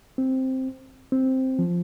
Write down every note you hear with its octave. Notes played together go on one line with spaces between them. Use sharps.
C4
C4
F3